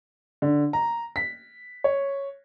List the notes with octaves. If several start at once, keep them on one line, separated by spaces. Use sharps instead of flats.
D3
A#5
B6
C#5